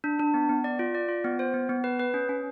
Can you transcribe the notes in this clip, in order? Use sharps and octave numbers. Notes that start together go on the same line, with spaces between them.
D4
D4
B3
B3
D5
F4
D5
F4
B3
C5
B3
B3
B4
B4
C#4
C#4